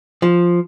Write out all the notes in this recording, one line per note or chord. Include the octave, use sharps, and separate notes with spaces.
F3